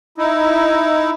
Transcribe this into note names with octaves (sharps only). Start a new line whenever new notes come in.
D#4 E4